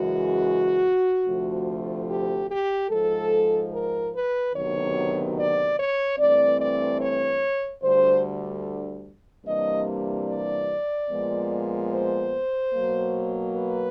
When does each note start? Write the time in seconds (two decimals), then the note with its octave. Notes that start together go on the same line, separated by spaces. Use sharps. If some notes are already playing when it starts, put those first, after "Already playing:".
Already playing: F#2 C#3 E3 G#3 F#4
1.26 D2 C3 F3 A3
2.09 G4
2.49 G4
2.90 G#2 F3 G#3 A4
3.72 A#4
4.13 B4
4.54 D2 C3 D#3 F#3 B3 C#5
5.37 D5
5.77 C#5
6.18 G2 E3 A3 C4 D5
6.60 D5
7.00 C#5
7.83 D2 D3 G3 C5
9.46 C3 E3 G3 A#3 D4 D#5
10.29 D5
11.10 A#2 F3 G#3 B3
11.92 C5
12.74 B2 F#3 A#3
13.56 B4